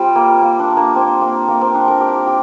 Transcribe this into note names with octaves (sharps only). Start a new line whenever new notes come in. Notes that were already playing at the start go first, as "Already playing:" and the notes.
Already playing: G3 C4 F4
A#3
A#3
D4
A#3
C4
A#3
A#3
C4
D4
A#4
G4
G4